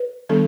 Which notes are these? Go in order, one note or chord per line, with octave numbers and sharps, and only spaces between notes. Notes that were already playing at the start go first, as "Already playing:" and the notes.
Already playing: B4
D#3 G3 B3 D4 A4